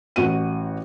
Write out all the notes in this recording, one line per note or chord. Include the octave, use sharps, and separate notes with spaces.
A1 F#4 D#7